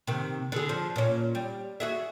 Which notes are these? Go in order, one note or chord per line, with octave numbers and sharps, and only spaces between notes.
C3 D#3
D3 G#4
F3
A#2 C#4
G3
F#4 G#4 E5